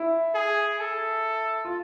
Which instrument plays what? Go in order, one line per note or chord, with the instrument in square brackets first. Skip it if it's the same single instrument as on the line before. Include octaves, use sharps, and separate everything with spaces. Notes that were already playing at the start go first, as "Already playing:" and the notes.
Already playing: [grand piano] E4
[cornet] G#4
A4
[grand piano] F4